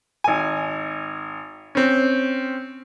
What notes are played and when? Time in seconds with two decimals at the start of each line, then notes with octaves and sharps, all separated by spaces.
0.24 G#1 G#5
1.75 C4 C#4